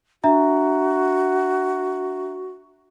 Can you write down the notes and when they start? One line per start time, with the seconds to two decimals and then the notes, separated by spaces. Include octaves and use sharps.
0.24 D4 F#4 E5 A#5